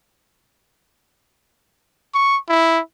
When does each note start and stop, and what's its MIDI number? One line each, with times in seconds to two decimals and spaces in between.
2.14 2.37 85
2.49 2.80 64